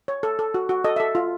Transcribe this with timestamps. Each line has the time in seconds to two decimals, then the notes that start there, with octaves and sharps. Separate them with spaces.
0.08 C#5
0.23 A4
0.39 A4
0.54 F#4
0.69 F#4
0.84 A4 D#5
0.96 A4 E5
1.15 F4